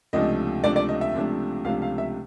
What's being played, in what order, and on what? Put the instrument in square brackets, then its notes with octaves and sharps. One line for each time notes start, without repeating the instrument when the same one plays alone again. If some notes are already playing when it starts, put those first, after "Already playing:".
[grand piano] C#2 C3 F3 A3 D4 D#5
C#2 C3 F3 A3 D4 D5
D5
D#5
E5
C#2 C3 F3 A3 D4
C#2 C3 F3 A3 D4 F5
F5
E5